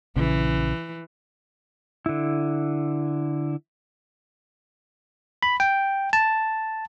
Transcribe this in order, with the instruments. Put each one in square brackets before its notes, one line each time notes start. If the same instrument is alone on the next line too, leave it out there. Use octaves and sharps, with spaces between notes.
[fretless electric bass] A#1 C#3 [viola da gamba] E3
[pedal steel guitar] D3 E4
[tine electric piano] B5
G5
A5